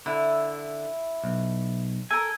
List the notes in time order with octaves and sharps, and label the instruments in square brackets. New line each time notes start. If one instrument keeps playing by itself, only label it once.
[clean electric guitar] D3 [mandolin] E4
[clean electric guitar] B1
[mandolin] A4 A#4 [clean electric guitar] G#5